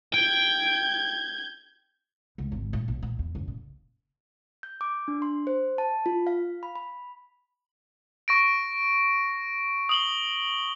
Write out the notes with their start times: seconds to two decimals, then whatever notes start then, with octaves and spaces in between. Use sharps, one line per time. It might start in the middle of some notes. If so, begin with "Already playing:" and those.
0.14 G5 G6 G#6
2.38 C#2
2.52 G#1
2.73 A#2
2.88 B1
3.03 A#2
3.19 E2
3.35 F#1
3.48 A#2
4.63 G6
4.81 D6
5.08 D4
5.22 C6
5.47 C5
5.78 A5
6.06 F4
6.27 F5
6.63 B5
6.76 B5
8.28 C#6 A#6 D7
9.89 D#6 F#7 G7